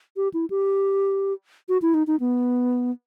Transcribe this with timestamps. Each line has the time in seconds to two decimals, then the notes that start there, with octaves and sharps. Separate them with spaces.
0.17 G4
0.34 E4
0.50 G4
1.69 F#4
1.82 E4
1.94 D#4
2.07 D#4
2.20 B3